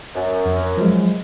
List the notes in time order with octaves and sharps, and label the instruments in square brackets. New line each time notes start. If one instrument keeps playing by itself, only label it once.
[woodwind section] F#2
[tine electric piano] F2
F3 F#3 G#3